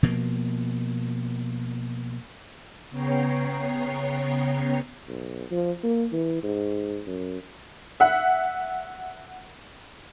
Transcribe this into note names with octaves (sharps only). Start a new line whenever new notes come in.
B2 F3 A#3
C#3 B3 C#5 G5 A#5 C7
B1
F3
A#3
E3
G#2
F#2
E5 F#5